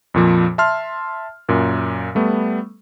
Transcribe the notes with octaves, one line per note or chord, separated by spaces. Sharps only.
F2 A#2 F3
E5 A5 C6 F6
F#2 A#2
G3 A3 B3